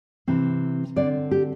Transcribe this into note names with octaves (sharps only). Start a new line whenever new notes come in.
C3 E3 C4
D3 C4 D5
G4